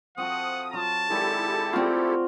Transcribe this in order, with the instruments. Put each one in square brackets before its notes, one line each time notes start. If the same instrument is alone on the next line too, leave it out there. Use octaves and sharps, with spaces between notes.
[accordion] F3 D#6 [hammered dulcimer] C4 F#4 A4 [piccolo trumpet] F#5
[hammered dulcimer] F#3 F4 [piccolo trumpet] A5
[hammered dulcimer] D#3 G#3 D5 [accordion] E4 G4 A4
[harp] C4 F4 [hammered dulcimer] F#4 D5